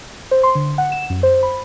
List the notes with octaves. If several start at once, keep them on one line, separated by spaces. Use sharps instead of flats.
C5
C6
D3
F#5
E7
F#2
C5
B5